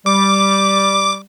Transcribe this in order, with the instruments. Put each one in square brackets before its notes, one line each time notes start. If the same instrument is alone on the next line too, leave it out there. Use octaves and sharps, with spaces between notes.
[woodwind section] G3 [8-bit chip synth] D6